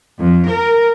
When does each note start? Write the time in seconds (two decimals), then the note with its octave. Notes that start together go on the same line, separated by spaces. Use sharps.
0.17 F2
0.48 A#4